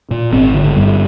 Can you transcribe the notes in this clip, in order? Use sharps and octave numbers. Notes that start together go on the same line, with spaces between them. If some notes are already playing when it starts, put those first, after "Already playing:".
A#2
G#1 C4
D3
G2